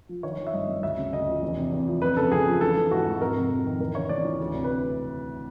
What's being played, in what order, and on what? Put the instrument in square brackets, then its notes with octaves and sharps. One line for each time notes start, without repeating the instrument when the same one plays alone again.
[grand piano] F3
D#3 C#5
D#3
E5
G2 D#5
G2
D2 E5
C#3
D2 D#5
F3
E2
C3
E2
F3
F2 B4
C#3 A4
F2 G#4
F3
E3 A4
E3
G#2 F#4
G#2
F2 A#4
C3
F2
D#3
E2 A#4
C#3 C#5
E2 D5
E3
D2
C3
B4